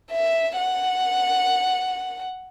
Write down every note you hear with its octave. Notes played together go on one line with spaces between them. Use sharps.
E5
F#5